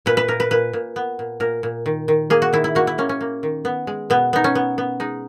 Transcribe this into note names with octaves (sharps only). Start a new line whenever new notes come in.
A#2 B4
B4
A#2 A#4
B4
A#2 B4
A#2
B3
A#2
A#2 A#4
A#2
D#3
D#3
A#3 G#4
F#4
D#3 E4
E4
A#3 F#4
E4
A#3 C#4
C#4
A#3
D#3
B3
G#3
B2 B3
B3 D#4
C#4
B3
B3
G#3 D#4